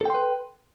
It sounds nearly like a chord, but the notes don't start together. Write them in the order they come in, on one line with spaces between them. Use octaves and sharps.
A4 G5 C6 B4